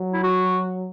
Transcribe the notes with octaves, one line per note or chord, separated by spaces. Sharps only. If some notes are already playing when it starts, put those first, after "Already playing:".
Already playing: F#3
E4
F#4